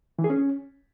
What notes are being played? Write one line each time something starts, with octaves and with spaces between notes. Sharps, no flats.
E3
G#4
C#4